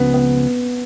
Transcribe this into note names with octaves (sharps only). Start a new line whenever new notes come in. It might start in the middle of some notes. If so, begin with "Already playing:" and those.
Already playing: C#2 C#3 F3 B3
B3